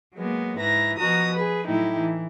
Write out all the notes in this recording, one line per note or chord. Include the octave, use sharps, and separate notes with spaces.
F#3 G#3 A#3 B3
G#2 E4 B4 A#5 A#6
B2 F3 F#4 A#5 D#6
G#4 B4
A2 F#3 D#4 E4 G4
E3